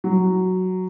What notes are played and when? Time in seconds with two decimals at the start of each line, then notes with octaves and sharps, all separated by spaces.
0.04 F#3